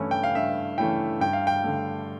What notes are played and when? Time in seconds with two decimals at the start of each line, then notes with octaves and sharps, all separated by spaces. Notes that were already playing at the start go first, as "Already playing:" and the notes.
Already playing: G2 E3 A3 C#4 E4
0.11 G5
0.23 F5
0.35 G2 E5
0.78 E3 A3 C#4 E4 G5
1.20 G2 G5
1.33 F5
1.47 G5
1.64 D3 A3